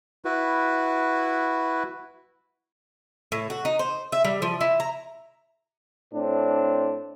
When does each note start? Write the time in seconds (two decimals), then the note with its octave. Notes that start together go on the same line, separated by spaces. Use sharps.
0.25 E4 F#4 B4
3.32 A2
3.50 F#4
3.65 D#4
3.79 C5
4.12 E5
4.25 G3
4.42 F3
4.61 E4
4.80 A#5
6.13 A2 C4 D4